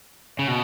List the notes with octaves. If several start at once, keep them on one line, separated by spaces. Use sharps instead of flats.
C#3
B2